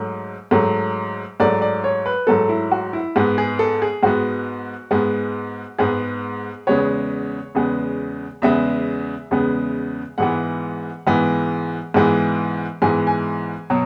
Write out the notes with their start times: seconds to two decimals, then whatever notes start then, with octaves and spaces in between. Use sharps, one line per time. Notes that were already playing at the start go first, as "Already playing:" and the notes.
Already playing: G#2 F#3 A3
0.51 G#2 F#3 A3
1.40 G#2 F#3 A3 D5
1.62 D5
1.84 C#5
2.06 B4
2.27 G#2 F#3 A3 A4
2.49 E4
2.72 F#4
2.93 E4
3.16 G#2 G#3 B3
3.38 G#4
3.59 A4
3.82 G#4
4.03 G#2 G#3 B3 F#4
4.91 G#2 G#3 B3
5.78 G#2 G#3 B3 G#4
6.67 E2 C#3 G#3 B3 C#5
7.55 E2 C#3 G#3 B3
8.42 E2 C#3 G#3 B3 E5
9.31 E2 C#3 G#3 B3
10.18 G#2 E3 G#3 B3 F#5
11.07 G#2 E3 G#3 B3
11.94 G#2 E3 G#3 B3
12.82 G#2 E3 G#3 B3 G#5
13.07 G#5
13.70 B2 F#3